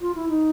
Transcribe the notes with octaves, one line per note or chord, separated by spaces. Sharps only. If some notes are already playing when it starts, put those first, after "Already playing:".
F4
E4
D#4